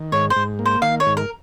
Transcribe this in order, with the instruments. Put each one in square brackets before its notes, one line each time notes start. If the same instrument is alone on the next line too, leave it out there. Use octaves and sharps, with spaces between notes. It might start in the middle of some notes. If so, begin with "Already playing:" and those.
Already playing: [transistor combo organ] D#3
[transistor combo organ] G#2 [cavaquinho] C#5
[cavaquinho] C5
[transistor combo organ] G#2
A#3
[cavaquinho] C5
[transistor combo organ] D#3 [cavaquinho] F5
[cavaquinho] C#5
[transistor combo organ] G#2
[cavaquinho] A#4